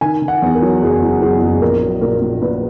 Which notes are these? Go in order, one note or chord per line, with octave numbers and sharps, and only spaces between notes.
D#3 G#5
D#3
F#5
E2
A#4
F#3
F#1 G#4
F#1
F#1 G#4
F#1
A#1 A#4
F#3
A#2 A#4
A#2
A#2 B4